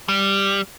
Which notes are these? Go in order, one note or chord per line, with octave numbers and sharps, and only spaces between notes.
G3